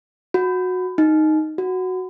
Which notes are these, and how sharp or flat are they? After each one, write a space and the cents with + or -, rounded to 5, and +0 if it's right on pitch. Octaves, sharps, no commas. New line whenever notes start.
F#4 -15
D#4 +0
F#4 +0